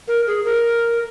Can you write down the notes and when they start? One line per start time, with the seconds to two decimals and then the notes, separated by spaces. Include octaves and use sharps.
0.08 A#4
0.27 G#4
0.45 A#4